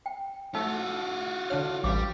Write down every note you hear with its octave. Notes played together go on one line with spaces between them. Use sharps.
G5
A3 D#4 F4 F#4 E6
D3 D4 C#5 F6
A1 G3 F#4 F5 D6